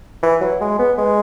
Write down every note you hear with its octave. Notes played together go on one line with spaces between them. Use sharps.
E3
F#3
G#3
B3
G#3